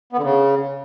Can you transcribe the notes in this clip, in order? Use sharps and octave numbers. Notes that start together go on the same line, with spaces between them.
B3
D3
C#3